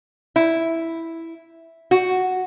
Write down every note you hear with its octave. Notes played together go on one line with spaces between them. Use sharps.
E4
F#4